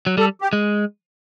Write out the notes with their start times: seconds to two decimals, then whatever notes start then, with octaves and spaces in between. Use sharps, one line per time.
0.07 F#3
0.17 G3 A4
0.42 G4
0.53 G#3